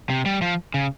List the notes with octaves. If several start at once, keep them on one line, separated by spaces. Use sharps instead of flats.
C3
G3
F3
C#3